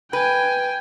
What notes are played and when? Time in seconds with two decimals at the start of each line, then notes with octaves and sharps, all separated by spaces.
0.13 B4 G5 G#5